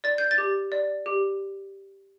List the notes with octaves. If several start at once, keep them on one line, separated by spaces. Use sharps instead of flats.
D5 A6
G6
A6
G4
D5
G4